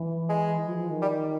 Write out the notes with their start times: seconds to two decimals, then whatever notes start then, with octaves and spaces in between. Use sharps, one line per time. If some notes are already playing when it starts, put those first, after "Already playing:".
Already playing: E3
0.29 G#3
0.66 F3
0.78 F3
0.90 D#3
1.02 G3